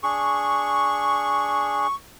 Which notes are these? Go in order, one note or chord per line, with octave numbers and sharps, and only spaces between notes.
D4 G#4 C#6